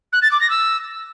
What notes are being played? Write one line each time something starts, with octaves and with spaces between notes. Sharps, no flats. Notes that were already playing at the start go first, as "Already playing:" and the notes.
F#6
A6
D6
A#6
E6